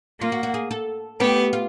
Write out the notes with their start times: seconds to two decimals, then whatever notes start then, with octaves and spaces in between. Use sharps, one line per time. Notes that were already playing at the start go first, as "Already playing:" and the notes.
0.21 A#3 F4
0.32 F#4
0.43 F#4
0.54 G#4
0.71 A4
1.20 A3 B3 G4
1.53 F4